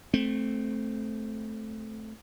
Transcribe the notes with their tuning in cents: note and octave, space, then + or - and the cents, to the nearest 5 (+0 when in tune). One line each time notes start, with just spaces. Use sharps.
A3 -10 C4 +0